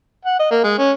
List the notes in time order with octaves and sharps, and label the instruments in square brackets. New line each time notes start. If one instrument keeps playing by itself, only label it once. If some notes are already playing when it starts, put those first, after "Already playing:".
[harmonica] F#5
D#5
A#3
G#3
C#4